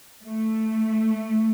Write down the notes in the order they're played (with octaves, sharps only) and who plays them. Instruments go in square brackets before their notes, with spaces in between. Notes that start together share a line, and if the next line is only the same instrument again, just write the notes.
[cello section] A3